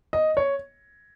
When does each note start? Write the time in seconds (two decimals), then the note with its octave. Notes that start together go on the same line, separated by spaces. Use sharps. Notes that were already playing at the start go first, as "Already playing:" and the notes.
0.13 D#5
0.37 C#5